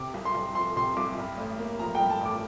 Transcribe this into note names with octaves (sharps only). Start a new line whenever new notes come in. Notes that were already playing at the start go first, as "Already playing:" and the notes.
Already playing: C3 D6
C2
C6
C2
F3 C6
C3 C6
C2 D6
G2
A1
A#3
F3 A#5
G2 G5
A5
A1 D6